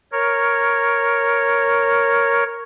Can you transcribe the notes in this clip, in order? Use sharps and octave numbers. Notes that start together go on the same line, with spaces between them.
A#4 C#5